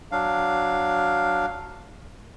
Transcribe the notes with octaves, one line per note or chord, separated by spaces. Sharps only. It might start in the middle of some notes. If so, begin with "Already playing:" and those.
F#3 D4 F5